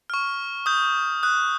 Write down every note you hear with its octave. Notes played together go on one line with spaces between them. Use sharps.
C#6 F6
D#6 G6
D#6 F#6